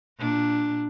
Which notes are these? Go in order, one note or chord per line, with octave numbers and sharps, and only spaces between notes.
A#2 D4